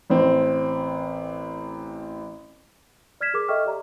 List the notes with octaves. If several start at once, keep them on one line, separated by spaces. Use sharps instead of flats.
A1 C4
D5 F6 G#6 B6 E7
G#4 A#4 D6
A4 D#5 E5 G5 C#6 F6
G4 D5 A#5